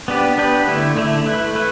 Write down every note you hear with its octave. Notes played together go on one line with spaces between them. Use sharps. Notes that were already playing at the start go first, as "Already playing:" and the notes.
B3 D4 G4 B4
B3 D4 G4 B4
D3 A3 E4
D3 A3 E4
A3 E4 B4
A3 E4 B4